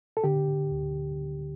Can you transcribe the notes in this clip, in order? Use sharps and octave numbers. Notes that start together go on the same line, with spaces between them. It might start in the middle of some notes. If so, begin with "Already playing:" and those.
A4
D3 G4
D2